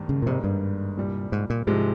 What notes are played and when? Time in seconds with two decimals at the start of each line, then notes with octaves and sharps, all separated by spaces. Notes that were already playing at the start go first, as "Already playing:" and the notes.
Already playing: G#1 G2 D#3 A#3
0.09 C#3
0.22 A#2
0.26 G#1 G#2 C3 G3 A#3
0.44 G2
0.97 C2 A#2 G3
1.32 G#2
1.50 A#2
1.67 C2 G#2 C3 F3 G#3